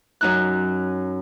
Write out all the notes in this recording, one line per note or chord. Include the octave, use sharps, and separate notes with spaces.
F#2 D#4 F#6